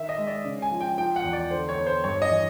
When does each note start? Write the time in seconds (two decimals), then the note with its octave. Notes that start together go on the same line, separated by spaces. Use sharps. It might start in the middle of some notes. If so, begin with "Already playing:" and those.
Already playing: D#3 E5
0.09 D#5
0.18 G#3
0.27 D5
0.45 C#3
0.62 G#5
0.71 F3
0.80 G5
0.98 F3 G5
1.16 F#5
1.24 E2
1.33 D5
1.51 D3 C5
1.69 C#5
1.77 B3
1.87 C5
2.04 G2 C#5
2.22 D#5
2.31 E3